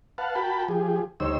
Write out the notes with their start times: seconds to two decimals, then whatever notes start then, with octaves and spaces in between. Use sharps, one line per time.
0.18 B4 F5 F#5 A5
0.35 F#4 A#4 G5 A5 B5
0.68 F3 G4 G#4
1.20 D2 G3 D#4 C5 C#5 E6